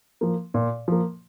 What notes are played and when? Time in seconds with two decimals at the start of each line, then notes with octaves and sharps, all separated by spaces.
0.21 F3 A#3
0.54 A#2
0.88 F3 A#3